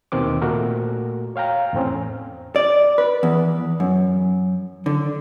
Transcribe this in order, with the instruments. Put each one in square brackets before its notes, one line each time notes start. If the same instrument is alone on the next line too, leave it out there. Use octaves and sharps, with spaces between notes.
[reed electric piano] D#2 B2 D#3 C4 D6
A#2 A3 F#4 A#4
C#5 F5 G5 A#5
E2 A2 C4 C#4
[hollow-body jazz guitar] D5
B4
E2
F#2
D3